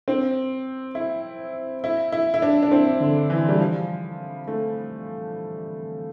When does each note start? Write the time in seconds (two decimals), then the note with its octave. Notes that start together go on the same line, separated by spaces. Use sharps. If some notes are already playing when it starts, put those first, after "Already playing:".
0.08 C4
0.95 E4
1.84 E4
2.12 E4
2.34 E4
2.42 D4
2.62 D4
2.71 C4
3.00 D3
3.30 E3
3.49 G3
3.59 F3
4.47 A3